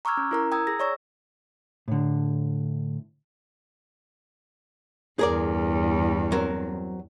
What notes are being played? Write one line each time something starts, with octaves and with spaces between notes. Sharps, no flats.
A#5 C#6 D6 E6 F6 G#6
C#4
E4 A#4 A#5
G5 A#5 D#6 E6 G#6
G#4 A#6
C#5 D5 C#6 E6 A#6
A2 D3
E2 G2 G#4 A#4 D5
F#3 C4 A#4